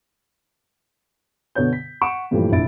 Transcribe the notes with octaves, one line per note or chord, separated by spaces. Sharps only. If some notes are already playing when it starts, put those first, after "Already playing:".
B2 D3 B3 C#5 G6
B6
F#5 C#6 D7 E7
G2 A#2 E3 F3 G3 A3
F1 A#1 D4 E4 A6 D7